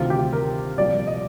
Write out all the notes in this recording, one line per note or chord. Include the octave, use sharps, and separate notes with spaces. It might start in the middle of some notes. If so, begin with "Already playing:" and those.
Already playing: D2 C3 D#3 F4
G4
A#4
C2 A#2 F3 D5
D#5